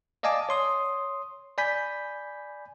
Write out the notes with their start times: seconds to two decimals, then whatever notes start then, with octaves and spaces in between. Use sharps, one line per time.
0.23 D5 D#5 F5 G#5 A5 D6
0.49 C#5 C6 D#6
1.58 D5 G#5 B5 G6 B6